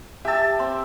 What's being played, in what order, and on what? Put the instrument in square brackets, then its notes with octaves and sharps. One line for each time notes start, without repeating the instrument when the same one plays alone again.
[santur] G4 A5 [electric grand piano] E5 E6
[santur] C4